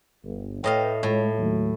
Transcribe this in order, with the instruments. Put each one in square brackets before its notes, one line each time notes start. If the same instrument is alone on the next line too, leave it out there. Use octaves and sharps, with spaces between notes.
[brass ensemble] G1
[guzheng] A2 D#5 F5 [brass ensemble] B4 G5
[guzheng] A2 [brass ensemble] G#3 A3 F4
[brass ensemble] D#2 F#3 A3